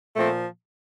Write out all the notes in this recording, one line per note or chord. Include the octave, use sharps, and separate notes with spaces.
A#2 F3 A3 C4